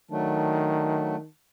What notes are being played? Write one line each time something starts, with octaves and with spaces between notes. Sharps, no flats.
D#3 F#3 A3 D4